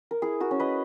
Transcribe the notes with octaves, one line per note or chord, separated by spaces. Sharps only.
A#4
E4 G#4
F#4 A#4
C#4
B4 D#5